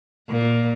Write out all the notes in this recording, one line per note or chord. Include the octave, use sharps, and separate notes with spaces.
A#2